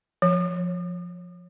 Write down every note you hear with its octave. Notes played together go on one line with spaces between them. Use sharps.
F3